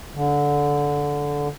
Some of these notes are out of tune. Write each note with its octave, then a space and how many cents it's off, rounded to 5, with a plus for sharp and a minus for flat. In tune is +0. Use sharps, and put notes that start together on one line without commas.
D3 -15